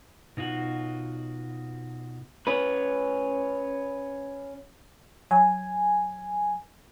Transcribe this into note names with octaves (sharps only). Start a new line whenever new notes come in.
B2 D#4 F4 F#4
C#4 B4
F#3 G#5